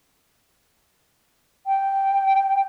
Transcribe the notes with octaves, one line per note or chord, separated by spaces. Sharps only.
G5